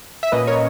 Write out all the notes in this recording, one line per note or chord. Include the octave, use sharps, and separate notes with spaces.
E5
A#2 A#3 C#4 B4 D#5
A#4 C#5